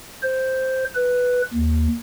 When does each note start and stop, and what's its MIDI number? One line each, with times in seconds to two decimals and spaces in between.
0.23 0.84 72
0.95 1.42 71
1.54 1.87 39